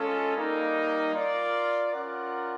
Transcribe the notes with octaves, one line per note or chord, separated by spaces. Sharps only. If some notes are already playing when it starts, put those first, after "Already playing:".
Already playing: G#3 C#4 F4 A4
G3 A#3 D#4
F4 A#4 D5
C#4 F4 A#4 D5 F#5